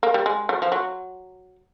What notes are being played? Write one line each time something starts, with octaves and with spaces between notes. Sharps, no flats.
A#3
G3
G#3
F#3
F3
F#3